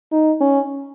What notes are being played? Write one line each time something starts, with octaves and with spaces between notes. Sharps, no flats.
D#4
C#4